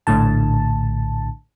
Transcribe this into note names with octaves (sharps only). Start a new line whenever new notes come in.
A#1 A2 D3 A5